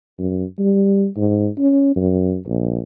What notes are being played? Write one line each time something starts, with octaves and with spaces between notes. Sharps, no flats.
F#2
G3
G#2
C#4
F#2
A#1